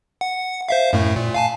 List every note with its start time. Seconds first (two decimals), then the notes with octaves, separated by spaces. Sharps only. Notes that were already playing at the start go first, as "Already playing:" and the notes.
0.21 F#5
0.69 C5 E5 F5
0.93 F#2 A2 A3
1.16 A#2
1.34 F5 G#5 A5